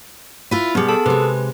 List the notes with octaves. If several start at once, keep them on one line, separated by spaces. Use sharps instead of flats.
E4 F4 B4
B2 G3 B3 G#4
G#4 A4 A5
C3 G#3 B4